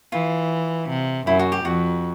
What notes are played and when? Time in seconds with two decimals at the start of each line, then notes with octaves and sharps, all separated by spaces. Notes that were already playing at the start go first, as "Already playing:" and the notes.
0.12 E3 F4
0.89 C3
1.27 F#2 E4
1.39 F#4
1.52 G4
1.64 F2 F#4